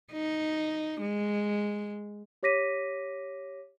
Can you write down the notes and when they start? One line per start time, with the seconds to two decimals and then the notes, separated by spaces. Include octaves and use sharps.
0.12 D#4
1.01 G#3
2.43 G4 C#5 D6 A#6 B6 D#7